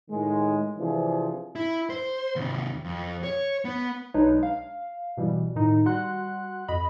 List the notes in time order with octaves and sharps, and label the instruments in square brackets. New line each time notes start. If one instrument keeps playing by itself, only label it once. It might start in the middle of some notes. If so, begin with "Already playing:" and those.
[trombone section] A2 D#3 G#3
C3 E3 F3 D4 G#4
[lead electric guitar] E4
C5
D#2 C3
F2
C#5
B3
[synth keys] B1 G#3 D4 D#4 B4 C#5
F5
B2 E3 G3
A2 D#3 D#4
G3 F#4 F#5 C6 F#6
F2 D#5 B5